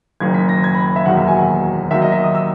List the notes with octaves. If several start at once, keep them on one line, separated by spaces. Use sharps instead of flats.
F#1 F#2 D#3 G#6
B6
A#6
G#6
B5
E5
E1 D#2 D#3 F#3 F#5
E5
G#5
F#5
D#2 D#3 F#3 E5
D#5
E5
D#6
E6